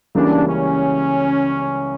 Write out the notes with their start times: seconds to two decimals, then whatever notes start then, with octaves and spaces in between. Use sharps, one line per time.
0.15 C#2 C#3 E3 G3 A#3 D4
0.48 C#4